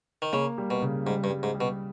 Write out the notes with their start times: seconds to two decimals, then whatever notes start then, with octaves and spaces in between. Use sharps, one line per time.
0.22 D#3
0.33 C#3 A#3
0.58 G3
0.70 B2
0.82 C#3
1.06 G#2 G3
1.24 G2
1.30 G3
1.43 G#2
1.54 G3
1.61 B2